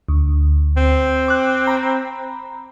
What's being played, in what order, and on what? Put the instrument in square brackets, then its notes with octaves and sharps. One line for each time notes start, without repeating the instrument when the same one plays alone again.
[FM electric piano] D2
[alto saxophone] C4
[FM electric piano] D6 F#6
A#5 B5